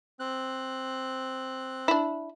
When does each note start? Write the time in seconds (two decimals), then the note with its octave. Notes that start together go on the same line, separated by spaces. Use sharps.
0.20 C4 F#6
1.88 D4 E4